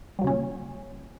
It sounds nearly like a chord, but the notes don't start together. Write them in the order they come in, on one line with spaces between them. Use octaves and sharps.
G3 F#3 C#3 C#4 A#2